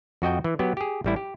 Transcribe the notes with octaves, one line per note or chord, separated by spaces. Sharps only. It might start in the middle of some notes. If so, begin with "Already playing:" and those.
F2 F#4 D#5 G5
E3
F#3 B3 G4
G4 G#4
A1 G3 E4
G4